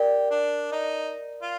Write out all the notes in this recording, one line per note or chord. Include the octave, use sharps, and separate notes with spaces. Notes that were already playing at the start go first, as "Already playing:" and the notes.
Already playing: G4 A#4 D5
D4
D#4
F4